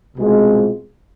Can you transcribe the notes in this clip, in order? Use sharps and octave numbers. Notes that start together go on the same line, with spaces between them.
C2 B2 G#3 C4 F4